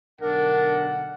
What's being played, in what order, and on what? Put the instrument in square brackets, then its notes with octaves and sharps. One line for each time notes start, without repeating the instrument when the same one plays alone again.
[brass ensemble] B1 D3 F#5 [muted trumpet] D4 [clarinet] A#4